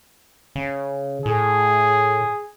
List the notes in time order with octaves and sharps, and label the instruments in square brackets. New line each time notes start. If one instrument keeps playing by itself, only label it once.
[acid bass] C#3
[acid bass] A2 [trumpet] G#4